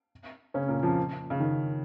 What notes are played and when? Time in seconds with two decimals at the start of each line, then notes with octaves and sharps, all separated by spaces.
0.54 C#3 C#4
0.68 A#2 A#3
0.83 F2 F3
1.30 C#3
1.40 D#3